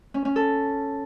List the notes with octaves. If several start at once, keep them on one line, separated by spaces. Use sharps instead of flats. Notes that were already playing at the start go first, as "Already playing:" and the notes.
C#4
C#4
A4